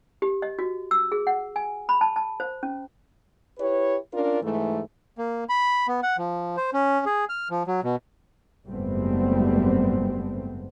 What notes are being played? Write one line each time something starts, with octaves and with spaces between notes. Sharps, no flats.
G4
D#5
F#4
E6
G#4
F#5
G#5
B5
A5
A5
C5
C#4
E4 G4 B4 C#5
C#4 D4 F4 A#4 D5
G#2 E3 A3
A#3
B5
B3
F#5
F3
C5
C#4
G#4
F6
F3
F#3
B2
F#1 G#2 G3 A3 B3 C4